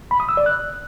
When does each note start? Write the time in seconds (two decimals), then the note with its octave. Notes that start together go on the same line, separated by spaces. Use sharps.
0.11 B5
0.20 D#6
0.29 E6
0.37 D5
0.46 F#6